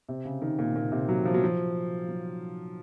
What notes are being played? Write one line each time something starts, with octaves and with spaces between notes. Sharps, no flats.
C3
C#3
D#3
A#2
A#2
C3
F#3
F3
F#3
F3
F#3